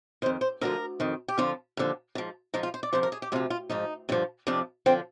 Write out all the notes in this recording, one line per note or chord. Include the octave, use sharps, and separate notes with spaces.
F2 D#3 C5
C5
D2 D3 F3 A#4
F2 D#3
G4
F2 D3 F3 F4
D#2 D3 F3
G#2 F3
G#2 F3 D#4
F4
C5
D5
F2 C3 F3 C5
A#4
G#4
G4
D2 C3 F3 F4
F4
G#2 F3 D#4
G2 D3 F3
F2 C3 F3 D4
D3 F3 C4